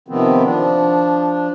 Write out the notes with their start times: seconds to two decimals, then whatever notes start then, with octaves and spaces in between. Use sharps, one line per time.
0.08 C3 D#3 F3 B3 C4
0.44 F3 D4